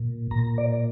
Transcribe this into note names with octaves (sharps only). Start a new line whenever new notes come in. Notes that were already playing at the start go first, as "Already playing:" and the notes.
Already playing: A#2
A#2 A#5
D5